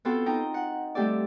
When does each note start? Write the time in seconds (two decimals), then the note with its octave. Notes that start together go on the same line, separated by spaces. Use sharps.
0.05 B3 C4 F4 F#4 A4 C5
0.26 D#4 G5 A#5
0.54 F#5
0.95 G3 A3 C4 G4 A4 D5